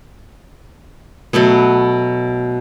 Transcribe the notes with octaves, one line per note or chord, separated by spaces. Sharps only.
B2 F#3 A3 B3